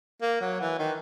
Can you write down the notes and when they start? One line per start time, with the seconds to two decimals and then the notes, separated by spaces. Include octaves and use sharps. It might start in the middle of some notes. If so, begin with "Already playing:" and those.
0.22 A#3
0.41 F#3
0.61 E3
0.79 D#3